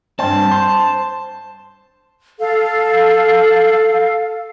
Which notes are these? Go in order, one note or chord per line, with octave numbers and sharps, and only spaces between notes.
G2 C4 A5
C5
A4 F5